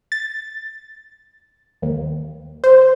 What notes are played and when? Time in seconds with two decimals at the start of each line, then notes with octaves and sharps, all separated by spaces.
0.12 A6
1.82 D#2
2.64 C5